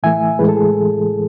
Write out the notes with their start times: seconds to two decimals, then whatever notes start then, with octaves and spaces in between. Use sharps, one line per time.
0.03 A2 E3 A3 E5 G#5
0.39 A2 E3 G#3 G#4 B4
0.48 A4
0.56 G#4